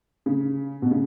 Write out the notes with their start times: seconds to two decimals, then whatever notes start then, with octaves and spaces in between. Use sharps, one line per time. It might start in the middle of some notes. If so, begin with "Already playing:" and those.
0.26 C#3
0.82 B2
0.91 C#3